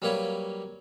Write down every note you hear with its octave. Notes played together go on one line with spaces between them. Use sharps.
F#3 G3 A#3 B4 C#5